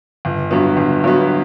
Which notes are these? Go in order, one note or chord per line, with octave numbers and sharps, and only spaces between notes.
G1
G2 F#3 B3
G1
G2 F#3 B3